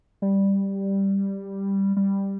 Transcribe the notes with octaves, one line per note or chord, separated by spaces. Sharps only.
G3
G3